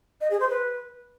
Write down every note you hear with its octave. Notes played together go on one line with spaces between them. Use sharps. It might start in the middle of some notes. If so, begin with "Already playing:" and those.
D#5
G#4
C5
B4